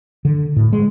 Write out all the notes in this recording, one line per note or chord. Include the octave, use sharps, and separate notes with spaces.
D3
A2
G#3